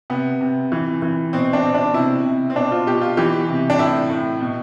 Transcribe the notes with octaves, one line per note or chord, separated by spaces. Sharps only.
C3 B3
C3
E3
E3
B2 C4
D4
B2 C4
D4
C3 E4
C3
C4
B2 D4
F4
B2 G4
F4
E3 G4
C3
D4
A2 E4
A2
B2